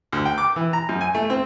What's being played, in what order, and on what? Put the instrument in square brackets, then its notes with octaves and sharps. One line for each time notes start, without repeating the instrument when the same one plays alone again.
[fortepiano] D2
G5
D6
E3
A#5
F#2
G#5
A3
C4